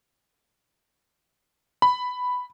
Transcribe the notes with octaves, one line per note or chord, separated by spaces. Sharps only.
B5